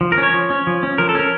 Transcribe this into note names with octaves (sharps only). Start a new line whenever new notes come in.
F3
A#4
C#4
C#5
F3
C#4
F3
C#4
F3 A#4
A4
C#4 A#4